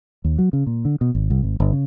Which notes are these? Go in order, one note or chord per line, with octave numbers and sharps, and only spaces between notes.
D#2
F#3
C#3
A#2
D3
B2
G#1
C2
G#1
G1
C#3